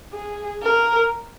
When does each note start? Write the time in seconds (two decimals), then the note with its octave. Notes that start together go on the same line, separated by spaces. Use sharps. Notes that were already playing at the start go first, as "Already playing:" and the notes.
0.13 G#4
0.62 A#4